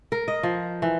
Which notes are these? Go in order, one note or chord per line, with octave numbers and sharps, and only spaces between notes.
A#4
D#5
F3
E3